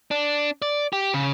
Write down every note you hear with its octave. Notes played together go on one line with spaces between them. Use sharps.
D4
D5
G4
C#3